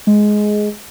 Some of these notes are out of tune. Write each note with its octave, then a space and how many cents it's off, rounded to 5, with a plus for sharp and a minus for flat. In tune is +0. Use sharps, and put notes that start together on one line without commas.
G#3 +10